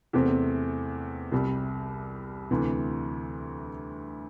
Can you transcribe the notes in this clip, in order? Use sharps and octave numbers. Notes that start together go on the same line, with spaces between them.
E2 C3 A3 C4
C2 C3 G3
D2 C3 E3